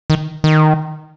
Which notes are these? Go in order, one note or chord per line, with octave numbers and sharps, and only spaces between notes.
D#3
D#3